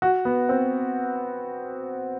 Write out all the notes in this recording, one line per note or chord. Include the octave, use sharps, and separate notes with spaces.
F#4
B3
C4